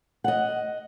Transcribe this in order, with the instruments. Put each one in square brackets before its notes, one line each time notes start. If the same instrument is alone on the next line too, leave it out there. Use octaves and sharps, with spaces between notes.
[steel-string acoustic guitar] D#5 F#5